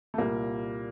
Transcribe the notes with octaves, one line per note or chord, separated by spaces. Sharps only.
A3
C2 A#2 G3 A#3